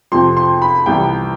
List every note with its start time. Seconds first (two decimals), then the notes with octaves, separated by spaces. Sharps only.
0.12 F2 C3 F3 C4 C6
0.37 C6
0.62 B5
0.86 C2 C3 E3 G5